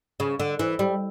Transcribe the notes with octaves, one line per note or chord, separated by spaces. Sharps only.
C#3
D3
E3
G3